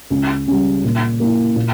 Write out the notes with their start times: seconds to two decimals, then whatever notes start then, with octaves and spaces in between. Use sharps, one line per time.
0.10 C#2
0.47 C#3 G3
0.84 A#2
1.20 A#3 E4
1.56 A#2